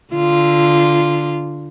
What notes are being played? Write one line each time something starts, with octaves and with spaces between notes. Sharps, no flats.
D3 F4